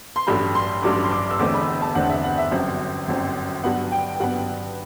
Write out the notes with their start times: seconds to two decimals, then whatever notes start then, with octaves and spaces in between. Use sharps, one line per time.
0.16 C6
0.27 A1 G2 F#3 A3 B5
0.55 C6
0.83 A1 G2 F#3 A3 D6
1.04 C6
1.11 D6
1.31 E6
1.39 E1 E2 D3 A3 C4 D6
1.54 B5
1.82 A5
1.95 E1 E2 D3 A3 C4 F#5
2.10 E5
2.24 F#5
2.38 E5
2.51 G1 F#2 F#3 C4
3.08 G1 F#2 F#3 C4
3.64 G2 F#3 B3 F#5
3.92 G5
4.13 G5
4.20 G2 F#3 B3 F#5